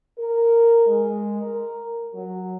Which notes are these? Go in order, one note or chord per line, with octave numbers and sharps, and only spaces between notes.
A#4
G#3
A#4
F#3